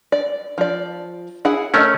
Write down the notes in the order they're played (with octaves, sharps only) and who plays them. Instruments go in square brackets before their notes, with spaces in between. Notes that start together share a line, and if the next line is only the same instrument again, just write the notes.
[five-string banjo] D5
F3 D5
E4 G#4 F#5
[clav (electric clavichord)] A3 C#4 [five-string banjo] A#4 D#5